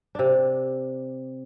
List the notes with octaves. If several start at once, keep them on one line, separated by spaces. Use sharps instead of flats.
C3 D4